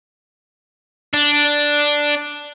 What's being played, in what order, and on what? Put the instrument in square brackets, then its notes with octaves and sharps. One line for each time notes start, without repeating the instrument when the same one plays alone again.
[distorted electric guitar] D4